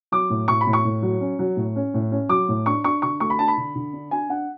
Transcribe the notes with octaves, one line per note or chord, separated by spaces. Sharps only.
F#3 D6
A2
A2 C#6
B5
A2
C#6
A2
F#3
C#4
F#3
A2
C#4
A2
C#4
F#3 D6
A2
D4 C#6
D4 C#6
D3 C#6
A3 C#6
B5
D4 A5
B5
D3
D3
D4
D4 G#5
D4 F#5